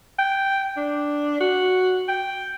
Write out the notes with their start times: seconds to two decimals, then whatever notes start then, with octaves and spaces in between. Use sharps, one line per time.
0.19 G5
0.77 D4
1.40 F#4
2.08 G5